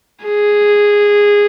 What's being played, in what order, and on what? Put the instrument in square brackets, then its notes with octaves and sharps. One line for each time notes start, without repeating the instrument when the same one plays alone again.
[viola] G#4